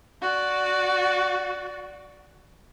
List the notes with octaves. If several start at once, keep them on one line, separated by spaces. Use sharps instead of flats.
F#4 D5